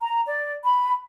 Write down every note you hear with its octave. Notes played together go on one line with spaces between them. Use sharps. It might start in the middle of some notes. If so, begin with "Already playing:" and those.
A#5
D5
B5